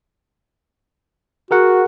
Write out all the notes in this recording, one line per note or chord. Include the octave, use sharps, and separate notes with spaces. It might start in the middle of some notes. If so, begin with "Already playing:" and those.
F#4 G#4 A#4 F#5